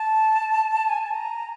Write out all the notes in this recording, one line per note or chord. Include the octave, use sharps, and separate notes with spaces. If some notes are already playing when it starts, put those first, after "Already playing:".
Already playing: A5
G#5
A5
A#5